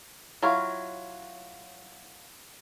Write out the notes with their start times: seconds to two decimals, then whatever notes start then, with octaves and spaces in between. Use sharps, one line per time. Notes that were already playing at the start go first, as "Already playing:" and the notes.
0.42 F#3 E4 F4 C#5 F5